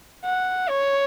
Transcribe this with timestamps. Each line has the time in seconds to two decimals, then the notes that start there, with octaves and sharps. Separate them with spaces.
0.24 F#5
0.69 C#5